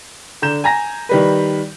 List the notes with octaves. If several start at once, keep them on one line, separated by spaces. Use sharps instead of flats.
D3 A#5 G6 E7
G#5 A#5 A#6
D#3 G3 B4